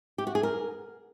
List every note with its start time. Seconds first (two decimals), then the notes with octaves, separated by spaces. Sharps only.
0.18 G4
0.27 F#4
0.35 G#4
0.43 A#4